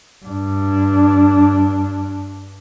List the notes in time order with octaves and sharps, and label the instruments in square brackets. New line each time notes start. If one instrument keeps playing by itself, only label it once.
[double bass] G2 D4